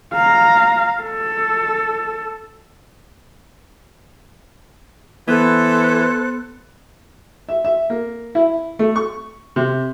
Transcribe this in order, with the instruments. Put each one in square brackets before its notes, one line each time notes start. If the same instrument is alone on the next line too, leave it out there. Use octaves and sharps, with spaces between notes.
[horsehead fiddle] F5 A#5
A4
[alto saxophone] E3 [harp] B3 [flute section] A4 C5 F#6
[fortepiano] E5
E5
A#3
E4
A3
C#6
C3